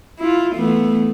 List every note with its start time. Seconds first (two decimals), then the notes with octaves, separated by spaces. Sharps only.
0.19 E4 F4
0.55 E3 A3 B3